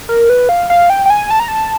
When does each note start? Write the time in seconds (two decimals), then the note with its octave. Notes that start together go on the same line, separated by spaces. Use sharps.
0.09 A#4
0.30 B4
0.49 F5
0.70 F5
0.90 G5
1.06 G5
1.10 G#5
1.31 A5
1.40 A#5
1.48 A5